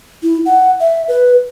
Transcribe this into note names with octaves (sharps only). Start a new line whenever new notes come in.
E4
F#5
E5
B4